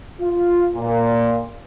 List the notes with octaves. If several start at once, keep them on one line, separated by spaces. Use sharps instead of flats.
F4
A#2